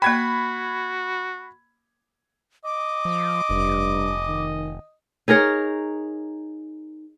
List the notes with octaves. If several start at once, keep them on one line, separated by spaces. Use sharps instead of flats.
A#3 F#4 G5 B5 G#6
D#5 D6
F3
F1 G2
D#3
D#4 G#4 A#4 C#5